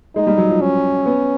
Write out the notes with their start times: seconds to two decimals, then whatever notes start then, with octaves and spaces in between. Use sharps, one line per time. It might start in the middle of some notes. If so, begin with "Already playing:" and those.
0.15 G#3 D#4
0.27 G3
0.38 F#3
0.50 F3
0.61 C#4
1.06 B3